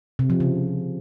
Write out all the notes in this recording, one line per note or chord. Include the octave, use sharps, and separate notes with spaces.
C3
F3
C#3